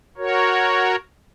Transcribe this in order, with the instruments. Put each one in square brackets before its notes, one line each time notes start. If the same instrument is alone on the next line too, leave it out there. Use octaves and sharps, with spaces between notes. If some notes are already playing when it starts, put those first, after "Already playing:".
[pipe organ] F#4 A#4 C#5